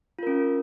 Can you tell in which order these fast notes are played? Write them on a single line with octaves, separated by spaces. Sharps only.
F4 A#4 C#4